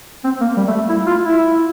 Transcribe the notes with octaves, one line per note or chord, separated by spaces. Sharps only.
C4
A#3
G3
A3
E4
F4
E4